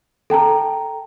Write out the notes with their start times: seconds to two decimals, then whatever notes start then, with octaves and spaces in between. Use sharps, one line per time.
0.30 A4 G5 A5 A#5